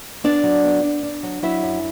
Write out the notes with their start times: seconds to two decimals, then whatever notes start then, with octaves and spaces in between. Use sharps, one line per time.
0.24 B3 D4 D5
0.43 F#3
0.64 B3
0.83 D4
1.03 D4
1.23 F#3
1.43 F#3 E4 E5
1.63 F#2